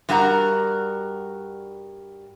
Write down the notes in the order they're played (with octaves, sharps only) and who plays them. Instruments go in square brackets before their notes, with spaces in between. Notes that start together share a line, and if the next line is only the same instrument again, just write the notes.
[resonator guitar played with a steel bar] G2 G3 F#4 A#4 F#5 A#5